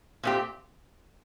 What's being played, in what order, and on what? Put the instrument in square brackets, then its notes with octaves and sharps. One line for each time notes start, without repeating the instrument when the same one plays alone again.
[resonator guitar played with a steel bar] A#2 A3 C4 G4